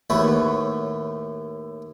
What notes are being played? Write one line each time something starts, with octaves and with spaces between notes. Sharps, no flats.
D#2 A2 A3 F#4 B4 C#5